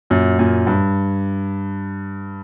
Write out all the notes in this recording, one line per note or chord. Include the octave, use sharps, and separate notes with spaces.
F#2 A#2
F#2 A#2
G2